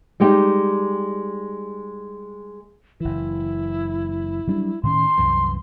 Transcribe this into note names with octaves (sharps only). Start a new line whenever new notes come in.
G3 G#3 D#4 G4
F#1 E3 E4
F#3 G3 D4
A2 D#3 C#4 C6
C2 F#2 E3